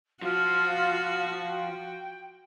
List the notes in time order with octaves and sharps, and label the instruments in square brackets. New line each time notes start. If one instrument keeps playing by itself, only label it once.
[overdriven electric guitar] F3 [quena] F4 [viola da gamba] F#4
[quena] G5